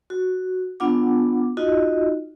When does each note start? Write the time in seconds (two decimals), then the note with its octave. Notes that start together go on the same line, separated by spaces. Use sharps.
0.10 F#4
0.80 B3 D4 F4 F#5 D6
1.57 D#4 F4 F#4 D#5